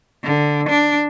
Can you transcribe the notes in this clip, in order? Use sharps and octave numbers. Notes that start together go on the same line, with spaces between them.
D3
D4